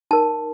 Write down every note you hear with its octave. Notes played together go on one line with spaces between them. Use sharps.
D#4 A#4 A5